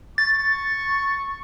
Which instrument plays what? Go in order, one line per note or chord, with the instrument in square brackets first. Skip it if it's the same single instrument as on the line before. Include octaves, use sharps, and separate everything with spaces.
[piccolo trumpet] C#6 [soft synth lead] A6